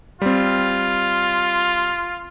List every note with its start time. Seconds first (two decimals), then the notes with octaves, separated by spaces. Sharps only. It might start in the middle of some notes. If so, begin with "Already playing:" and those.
0.22 G3 C4 F4